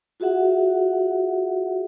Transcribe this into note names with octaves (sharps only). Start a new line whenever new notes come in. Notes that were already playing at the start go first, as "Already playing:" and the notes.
F4 F#4 G#4 E5 F#5